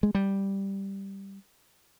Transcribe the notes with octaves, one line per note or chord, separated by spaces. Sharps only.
G#3
G3